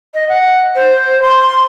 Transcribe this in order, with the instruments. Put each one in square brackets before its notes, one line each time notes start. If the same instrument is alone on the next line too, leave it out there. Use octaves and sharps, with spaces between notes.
[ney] D#5
F#5
C5
C6